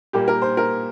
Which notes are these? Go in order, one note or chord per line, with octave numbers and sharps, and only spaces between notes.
A#2 G3 A#3 G4
A#4
C5
A#4